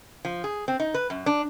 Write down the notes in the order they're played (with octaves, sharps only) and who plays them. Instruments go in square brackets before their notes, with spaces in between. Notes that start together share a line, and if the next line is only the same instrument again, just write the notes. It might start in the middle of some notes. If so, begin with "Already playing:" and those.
[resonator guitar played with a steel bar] F3
G#4
C4
D#4
B4
F#2
D4